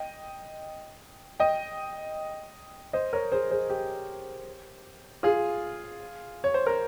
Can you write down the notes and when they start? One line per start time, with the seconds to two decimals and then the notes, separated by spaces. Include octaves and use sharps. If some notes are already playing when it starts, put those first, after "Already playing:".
Already playing: D#5 G5
1.40 D#5 G5
2.93 C5 D#5
3.13 A#4 C#5
3.32 G#4 C5
3.51 G#4 C5
3.70 G4
5.23 F4 G#4
6.44 C#5
6.54 C5
6.66 A#4